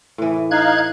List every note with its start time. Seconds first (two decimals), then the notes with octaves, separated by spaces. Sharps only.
0.18 A2 E3
0.51 D#4 F5 F#6 G#6